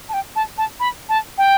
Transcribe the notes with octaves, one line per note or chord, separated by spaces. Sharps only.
A5
G5
A5
A5
B5
A5
G5